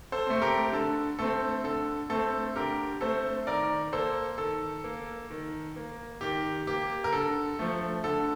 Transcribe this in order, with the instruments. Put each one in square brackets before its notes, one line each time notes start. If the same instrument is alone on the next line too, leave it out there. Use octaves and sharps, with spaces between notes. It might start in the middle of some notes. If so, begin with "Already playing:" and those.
[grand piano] A4 C5
A3 C4
G4 A#4
D3 A4
A3 C4 A4
D3 A4
A3 C4 A4
D3 G4 A#4
A3 C4 A4 C5
D#3 A#4 D5
A#3 A4 C5
D#3 A4
A#3
D#3
A#3
D#3 G4
A#3 G4
A#4
D3 A4
F3 A3
D3 A4